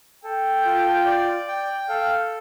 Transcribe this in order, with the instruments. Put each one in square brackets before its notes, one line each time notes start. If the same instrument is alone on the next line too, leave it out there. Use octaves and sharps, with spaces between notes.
[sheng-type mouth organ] A4 [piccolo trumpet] G5
[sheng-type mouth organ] F4
D5
G5
[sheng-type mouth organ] A4 [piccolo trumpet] F5